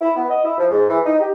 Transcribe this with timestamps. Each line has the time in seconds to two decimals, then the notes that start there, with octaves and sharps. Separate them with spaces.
0.01 E4
0.16 B3
0.30 D#5
0.44 E4
0.58 F3
0.71 G#2
0.90 E3
1.05 D#4
1.21 G4